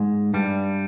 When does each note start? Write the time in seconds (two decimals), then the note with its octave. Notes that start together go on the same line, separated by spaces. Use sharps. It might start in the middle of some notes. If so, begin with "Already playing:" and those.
Already playing: G#2 G#3
0.34 G2 G3